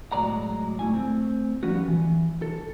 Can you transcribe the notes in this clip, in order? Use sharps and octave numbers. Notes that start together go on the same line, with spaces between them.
A2 F#3 G#3 D5 A#5
C#2 A3 E4 G#5
A3 C4
F3 G3 B3 C#4 F#4
E3
A4